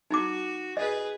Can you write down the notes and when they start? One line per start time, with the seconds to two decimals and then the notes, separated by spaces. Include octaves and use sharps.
0.11 D#4 E4 F#4 D6
0.77 G#4 B4 D#5